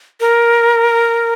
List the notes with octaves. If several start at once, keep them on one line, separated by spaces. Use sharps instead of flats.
A#4